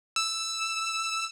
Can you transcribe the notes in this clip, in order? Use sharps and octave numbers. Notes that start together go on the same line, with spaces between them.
E6